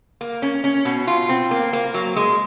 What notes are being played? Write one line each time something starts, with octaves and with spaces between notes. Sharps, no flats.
A#3
C#4
C#4
B2
F4
C4
A#3
A#3
F#3
G#3